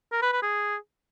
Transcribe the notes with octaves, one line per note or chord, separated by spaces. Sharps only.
A#4
B4
B4
G#4